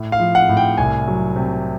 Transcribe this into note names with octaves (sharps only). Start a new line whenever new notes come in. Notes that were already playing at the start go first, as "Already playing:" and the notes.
Already playing: A2
F5
F3
F#5
A2
G5
C2 G#5
F#3
C3